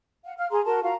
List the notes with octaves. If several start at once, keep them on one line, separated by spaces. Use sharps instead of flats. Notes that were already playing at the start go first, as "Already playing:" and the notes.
F5 F#5
F5 F6
G#4 A#5 C6
F#4 A#4 A5 C6
F4 F#4 F5 A#5